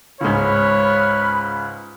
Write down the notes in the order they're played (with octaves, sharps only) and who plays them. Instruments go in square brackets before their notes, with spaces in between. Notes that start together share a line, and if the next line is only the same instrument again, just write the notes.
[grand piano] C#2 G#2 [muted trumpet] B4 [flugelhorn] C#5 [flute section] B5 F6